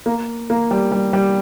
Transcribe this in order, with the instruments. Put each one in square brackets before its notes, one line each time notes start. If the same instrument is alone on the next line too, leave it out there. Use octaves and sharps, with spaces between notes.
[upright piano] A#3
A#3
G3
G3
G3